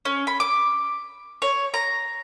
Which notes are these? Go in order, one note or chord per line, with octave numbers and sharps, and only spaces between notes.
C#4
B5
D6
C#5
A#5